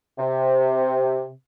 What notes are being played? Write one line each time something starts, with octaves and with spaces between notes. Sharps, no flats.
C3